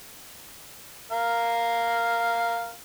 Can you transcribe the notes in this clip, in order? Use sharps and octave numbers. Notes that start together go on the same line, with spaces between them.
A#4 F5